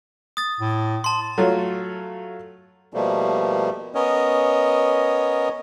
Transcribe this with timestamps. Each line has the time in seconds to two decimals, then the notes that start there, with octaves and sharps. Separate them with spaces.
0.37 D#6 A6
0.61 A2
1.04 A5 C6
1.38 F#3 A3 F4
2.94 B2 F3 G3 A3 A#3
3.95 B3 C#4 A#4 C#5 D#5